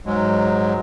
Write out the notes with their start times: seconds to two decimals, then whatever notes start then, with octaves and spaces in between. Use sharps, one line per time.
0.06 G#2 F#3 G#3